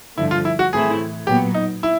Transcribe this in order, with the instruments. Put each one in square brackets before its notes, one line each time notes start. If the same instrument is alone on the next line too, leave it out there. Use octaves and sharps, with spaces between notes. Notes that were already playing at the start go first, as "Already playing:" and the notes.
[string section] G2 D3 F3 A3 [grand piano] E4
[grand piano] F4
E4
F#4
[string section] A2 E3 A3 C4 E4 [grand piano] G#4
[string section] A#2 F#3 B3 [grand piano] G4
[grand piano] D#4
E4